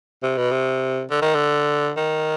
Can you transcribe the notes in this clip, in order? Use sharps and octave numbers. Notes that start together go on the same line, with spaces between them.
C3
B2
C3
D3
D#3
D3
D#3